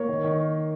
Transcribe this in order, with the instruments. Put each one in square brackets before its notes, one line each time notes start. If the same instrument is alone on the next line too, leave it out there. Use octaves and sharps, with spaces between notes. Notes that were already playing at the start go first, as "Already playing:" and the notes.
Already playing: [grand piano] A#3 C#5
D#3
D#3